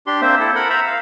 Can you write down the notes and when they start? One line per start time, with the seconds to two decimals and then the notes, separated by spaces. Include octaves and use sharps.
0.07 D4 G4 C6
0.21 A#3 C4 C5 E5
0.40 E4 A4
0.55 A#4 F#5 B5
0.70 C5 E5 A#5 B5
0.87 F5